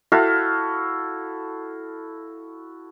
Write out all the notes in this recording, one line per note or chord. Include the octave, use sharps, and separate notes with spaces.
E4 F#4 A4 F5